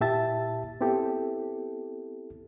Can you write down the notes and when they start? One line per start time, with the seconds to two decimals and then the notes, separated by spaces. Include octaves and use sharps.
0.01 A#2 E4 G4 E5 A5 A6
0.81 B3 C4 E4 G4 A4